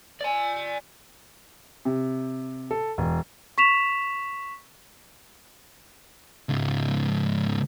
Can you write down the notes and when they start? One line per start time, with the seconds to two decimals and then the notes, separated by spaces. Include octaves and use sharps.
0.21 D5 G#5
1.85 C3
2.71 A4
2.98 E1
3.58 C#6 B6 E7 F7
6.49 C#2 G#2